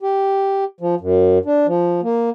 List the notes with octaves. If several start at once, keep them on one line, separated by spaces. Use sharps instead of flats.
G4
F3
F#2
D4
F3
A#3